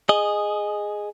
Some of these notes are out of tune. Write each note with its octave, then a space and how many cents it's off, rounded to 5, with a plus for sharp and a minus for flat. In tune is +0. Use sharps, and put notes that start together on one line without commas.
G#4 +0 D#5 -10